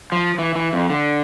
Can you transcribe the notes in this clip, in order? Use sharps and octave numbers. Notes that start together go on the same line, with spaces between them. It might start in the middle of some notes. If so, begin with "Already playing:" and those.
F3
E3
E3
F2
D3